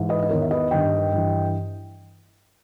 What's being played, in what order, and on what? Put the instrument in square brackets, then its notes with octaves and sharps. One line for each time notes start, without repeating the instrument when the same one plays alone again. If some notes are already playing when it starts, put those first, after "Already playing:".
Already playing: [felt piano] G#2 E3
B4 D#5
D#5
E2 D#3 A#4 C#5
E5
B4 D#5
G2 D#3 D#5 G5
G2 E3